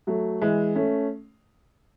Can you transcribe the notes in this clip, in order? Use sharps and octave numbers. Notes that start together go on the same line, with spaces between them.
F#3 A3
E3 G#3
A3 C#4